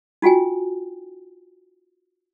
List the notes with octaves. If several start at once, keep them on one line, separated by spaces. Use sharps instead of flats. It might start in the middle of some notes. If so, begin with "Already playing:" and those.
D#4 F4 F#4 G5 G#5